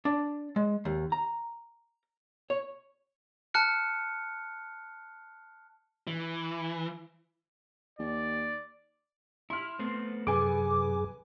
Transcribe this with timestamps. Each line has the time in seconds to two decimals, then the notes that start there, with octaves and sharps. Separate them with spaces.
0.05 D4
0.56 G#3
0.85 D#2
1.12 A#5
2.50 C#5
3.54 A5 F6 F#6 C#7
6.07 E3
7.99 D#2 D5
9.50 E4 C6 F6
9.79 A3 B3 C4
10.27 F#2 C3 G#4 A4 B4 G#5 D6